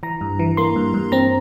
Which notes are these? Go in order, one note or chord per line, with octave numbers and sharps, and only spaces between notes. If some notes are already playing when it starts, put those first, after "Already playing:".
E3 A#5
G2
E3
A#3 C6
G2
G2
C4 A#5